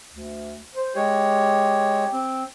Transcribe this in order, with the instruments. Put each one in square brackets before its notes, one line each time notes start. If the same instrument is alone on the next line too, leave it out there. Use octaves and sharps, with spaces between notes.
[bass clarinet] D2
C5
[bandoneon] G#3 C#5 [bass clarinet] G4
[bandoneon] C4